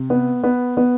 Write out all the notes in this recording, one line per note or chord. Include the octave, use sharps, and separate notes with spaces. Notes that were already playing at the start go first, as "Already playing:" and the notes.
Already playing: C3
B3
B3
B3